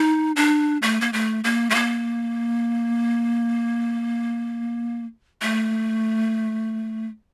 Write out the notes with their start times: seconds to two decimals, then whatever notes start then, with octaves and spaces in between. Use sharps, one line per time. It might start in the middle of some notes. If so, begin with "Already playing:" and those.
Already playing: D#4
0.36 D4
0.82 A3
1.01 A#3
1.13 A3
1.44 A#3
1.70 A3
1.74 A#3
5.42 A3